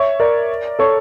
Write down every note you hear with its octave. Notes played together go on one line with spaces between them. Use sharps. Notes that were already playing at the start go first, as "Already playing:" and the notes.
Already playing: C#5 E5
A#4 D5
A4 C#5